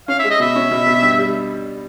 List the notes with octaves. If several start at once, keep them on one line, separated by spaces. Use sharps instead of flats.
C#4 F5
G#3 E5
D#5
B2 E5
C#4
B2
B2
G2
G3